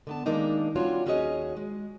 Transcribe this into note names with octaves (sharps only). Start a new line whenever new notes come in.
D3 B3 A5
D#3 G#3 A#3 D4 D#4
G3 C4 D4 F4 F#4 C#5
D#2 C#4 F#4 G#4 C#5 D#5
G#3